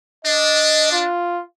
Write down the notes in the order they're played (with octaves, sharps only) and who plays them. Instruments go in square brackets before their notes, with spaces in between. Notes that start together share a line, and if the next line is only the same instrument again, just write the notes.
[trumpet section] D4 [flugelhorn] D#5
[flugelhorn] F4